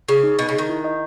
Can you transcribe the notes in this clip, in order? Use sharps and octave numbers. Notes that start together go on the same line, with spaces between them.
C#3 G#4
D#4
B2 D#5
C#3
D#3 D#4
E4
D#5